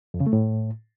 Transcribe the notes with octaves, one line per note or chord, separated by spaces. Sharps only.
F2
C#3
A3
A2